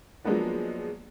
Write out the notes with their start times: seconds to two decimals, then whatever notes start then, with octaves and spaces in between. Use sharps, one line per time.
0.24 F3 F#3 G#3 A#3 B3 D4